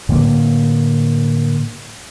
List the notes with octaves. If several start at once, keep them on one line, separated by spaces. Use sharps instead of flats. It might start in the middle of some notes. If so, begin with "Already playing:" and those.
A2 D3 A#3